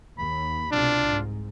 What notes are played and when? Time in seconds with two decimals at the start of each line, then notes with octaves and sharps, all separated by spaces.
0.18 D#2 B5
0.72 C2 B2 D4 F4
1.07 G#2